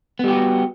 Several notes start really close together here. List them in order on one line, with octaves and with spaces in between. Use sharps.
B3 G3 G4 F#4